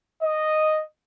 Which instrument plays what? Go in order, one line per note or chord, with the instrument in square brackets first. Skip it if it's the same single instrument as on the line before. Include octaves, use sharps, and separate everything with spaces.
[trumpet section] D#5